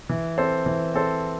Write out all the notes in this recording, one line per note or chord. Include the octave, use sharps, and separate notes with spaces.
E3
C4 A4 C5
E3
C4 A4 C5